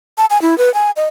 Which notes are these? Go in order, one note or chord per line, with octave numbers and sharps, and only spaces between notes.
A5
G#5
E4
B4
G#5
D#5